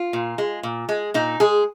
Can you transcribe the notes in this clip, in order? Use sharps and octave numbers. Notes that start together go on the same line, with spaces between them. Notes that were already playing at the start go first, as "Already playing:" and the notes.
Already playing: F4
A#2
G#3
A#2
G#3
A#2 D#4
G#3 G#4